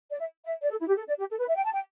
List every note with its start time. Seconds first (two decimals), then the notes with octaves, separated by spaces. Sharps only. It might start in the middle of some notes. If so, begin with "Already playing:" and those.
0.11 D5
0.20 E5
0.45 E5
0.62 D5
0.71 A4
0.80 E4
0.88 G4
0.96 A4
1.08 D5
1.19 G4
1.31 A4
1.39 B4
1.48 E5
1.56 G5
1.65 A5
1.73 G5